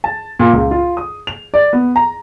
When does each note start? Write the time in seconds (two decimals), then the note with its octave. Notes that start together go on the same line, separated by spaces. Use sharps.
0.04 A5
0.39 A#2
0.53 C#2
0.71 F4
0.97 D#6
1.27 F7
1.54 D5
1.73 B3
1.96 A#5